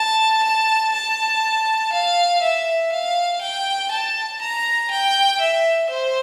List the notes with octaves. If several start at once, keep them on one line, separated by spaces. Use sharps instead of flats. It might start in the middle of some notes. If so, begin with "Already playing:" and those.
Already playing: A5
A5
A5
F5
E5
F5
G5
A5
A#5
G5
E5
C5